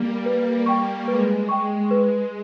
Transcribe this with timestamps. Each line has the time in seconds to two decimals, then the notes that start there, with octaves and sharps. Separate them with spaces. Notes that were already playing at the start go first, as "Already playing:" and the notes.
Already playing: G3 A#3
0.26 B4
0.66 G5 C#6
1.08 G#3 B4
1.49 G#3 G5 C#6
1.91 G#3 B4